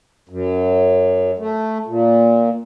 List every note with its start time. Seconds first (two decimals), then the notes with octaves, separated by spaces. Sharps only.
0.29 F#2
1.38 A3
1.87 A#2